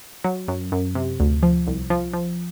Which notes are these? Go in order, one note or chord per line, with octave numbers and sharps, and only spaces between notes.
F#3
F#2
F#2
C3
D2
F3
C2
F3
F3